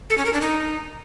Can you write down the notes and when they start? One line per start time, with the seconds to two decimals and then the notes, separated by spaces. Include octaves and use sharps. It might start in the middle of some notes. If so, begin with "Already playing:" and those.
0.10 A4
0.18 C#4
0.25 A#4
0.33 D4
0.41 D#4